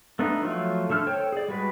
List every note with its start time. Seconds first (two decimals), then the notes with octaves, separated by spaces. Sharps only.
0.19 A3 B3 D4 D#4
0.42 F3 F#3 A3 F4
0.90 D3 A3 A4 F6
1.07 A4 C5 C#5 G5
1.32 G#4 D5
1.48 G3 G#3 F#4 B4